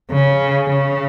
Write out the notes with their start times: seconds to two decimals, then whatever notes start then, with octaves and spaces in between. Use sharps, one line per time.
0.11 C#3
0.69 C#3